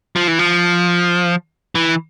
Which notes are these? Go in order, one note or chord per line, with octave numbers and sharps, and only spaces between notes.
F3
E3
F3
E3